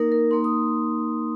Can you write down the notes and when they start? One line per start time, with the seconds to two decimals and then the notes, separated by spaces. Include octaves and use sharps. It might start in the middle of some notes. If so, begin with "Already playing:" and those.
Already playing: A#3 D#4 A#4
0.12 A#4
0.31 A#3 D#4 C6
0.44 D#6